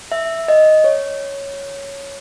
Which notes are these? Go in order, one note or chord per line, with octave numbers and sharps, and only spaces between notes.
E5
D#5
C#5